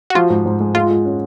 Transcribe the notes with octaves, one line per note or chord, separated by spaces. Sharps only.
F#4
F3 F4
G#2
G#2
G#3
G#3 F4
G#3
C#4